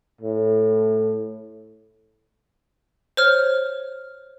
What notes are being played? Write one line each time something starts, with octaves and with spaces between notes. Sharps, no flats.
A2
C5 C#5 F6